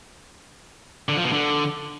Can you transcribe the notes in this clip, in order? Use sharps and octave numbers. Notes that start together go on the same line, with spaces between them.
D3
F3
B2
D3